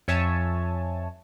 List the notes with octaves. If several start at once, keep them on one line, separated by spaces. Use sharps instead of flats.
F2 C#5 E5 G#5 A5